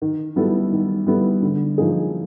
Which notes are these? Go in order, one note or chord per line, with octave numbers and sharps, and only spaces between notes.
D#3
G3 B3 E4 A4
D#3
G3 B3 E4 A4
D3
F3 A#3 D#4 G#4